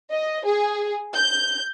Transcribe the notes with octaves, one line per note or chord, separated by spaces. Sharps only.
D#5
G#4
G6